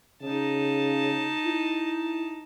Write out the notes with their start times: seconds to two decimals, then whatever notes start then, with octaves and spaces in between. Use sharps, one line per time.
0.22 C#3 D#4 A5
1.45 E4